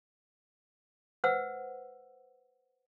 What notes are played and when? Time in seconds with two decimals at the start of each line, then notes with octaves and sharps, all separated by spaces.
1.24 B4 C5 F#5 E6